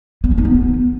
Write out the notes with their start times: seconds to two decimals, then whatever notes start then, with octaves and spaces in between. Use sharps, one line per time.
0.24 B3
0.31 C#4
0.38 D#4
0.45 B3